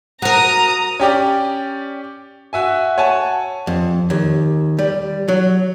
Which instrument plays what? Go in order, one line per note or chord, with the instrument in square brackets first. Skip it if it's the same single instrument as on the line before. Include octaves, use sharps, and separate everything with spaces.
[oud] F#4 A#4 [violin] A#5 D#6
[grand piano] C#4 G4 D5
F#4 E5 G#5
C#5 F#5 G#5 A5
[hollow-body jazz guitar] F2
D#2
G3
F#3